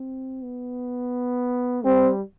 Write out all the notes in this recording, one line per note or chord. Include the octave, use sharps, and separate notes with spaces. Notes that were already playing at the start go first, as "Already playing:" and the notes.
Already playing: C4
B3
G3 C4